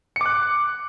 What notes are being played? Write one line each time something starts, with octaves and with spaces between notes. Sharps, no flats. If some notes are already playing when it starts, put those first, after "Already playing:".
D6 F#6 C#7